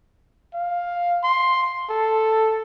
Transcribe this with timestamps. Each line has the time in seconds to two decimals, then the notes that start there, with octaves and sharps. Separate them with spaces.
0.54 F5
1.23 C6
1.89 A4